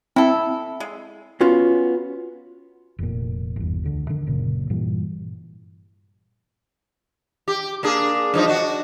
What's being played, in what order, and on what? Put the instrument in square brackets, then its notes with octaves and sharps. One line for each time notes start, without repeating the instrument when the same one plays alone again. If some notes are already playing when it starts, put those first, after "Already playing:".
[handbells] C4 [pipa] E4 A4
[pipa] G#3
[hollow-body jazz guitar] B3 C#4 F4 F#4
[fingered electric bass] F1 F2 A#2
G1 E2
D2 D3
D3 D#3
F#1 A#2 C#3
G2 A#2 E3 G3
[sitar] G4
A#3 D4 G#4
G2 F3 D#4
D4 F#4